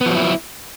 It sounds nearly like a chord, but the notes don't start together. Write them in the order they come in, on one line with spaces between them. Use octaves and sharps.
B3 F3 F#3 E4